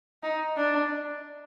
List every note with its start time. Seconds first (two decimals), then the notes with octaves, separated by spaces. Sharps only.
0.23 D#4
0.57 D4